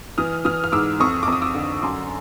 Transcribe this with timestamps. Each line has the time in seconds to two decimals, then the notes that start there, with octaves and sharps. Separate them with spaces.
0.18 E3 D#6 F6
0.45 E3 D#6 F6
0.64 F6
0.72 G#2 D6 E6
1.00 F2 C#6 D#6
1.23 D6
1.28 F2 D#6
1.42 D6 E6
1.55 D3
1.82 F#2 C6 D6